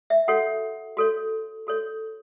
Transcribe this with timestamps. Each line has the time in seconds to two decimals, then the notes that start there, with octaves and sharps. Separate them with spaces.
0.10 E5
0.28 F#4 A4 C#5 F#5
0.97 F#4 A4 C#5
1.67 F#4 A4 C#5